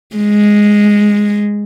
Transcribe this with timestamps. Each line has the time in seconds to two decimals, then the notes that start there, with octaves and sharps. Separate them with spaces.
0.16 G#3